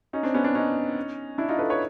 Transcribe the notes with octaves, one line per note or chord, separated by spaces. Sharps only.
C#4 D#4
C4 D4
B3 C#4
C4 D4
C#4 D#4
D4 E4
D#4 F4
A4 B4
B4 C#5